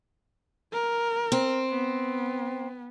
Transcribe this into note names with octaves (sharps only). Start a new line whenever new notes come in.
A#4
C4
B3